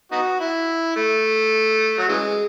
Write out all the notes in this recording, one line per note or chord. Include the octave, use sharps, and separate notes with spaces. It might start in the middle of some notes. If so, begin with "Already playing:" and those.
B3 D#4 F#4
E4
A3
F#3
C#3 E3 G#3